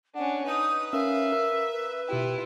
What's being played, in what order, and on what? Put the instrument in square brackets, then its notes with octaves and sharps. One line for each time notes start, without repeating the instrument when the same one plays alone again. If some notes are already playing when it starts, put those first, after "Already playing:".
[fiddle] C#4 D4 [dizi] F#5
[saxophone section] D#4 [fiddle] B4 [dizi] D#6
[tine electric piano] C#4 A#4 [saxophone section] E5 [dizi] F5
[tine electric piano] A#4
[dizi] B4
[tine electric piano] B2 G4 G5 [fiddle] E4 F4